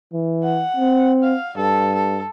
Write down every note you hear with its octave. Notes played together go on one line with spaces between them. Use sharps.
E3
F#5
C4
F5
G2 A4
A4